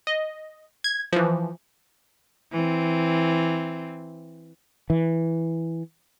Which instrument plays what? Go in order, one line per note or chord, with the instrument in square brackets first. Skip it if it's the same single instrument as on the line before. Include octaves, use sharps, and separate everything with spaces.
[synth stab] D#5
G#6
E3 F3
[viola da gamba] E3 C4
[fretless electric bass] E3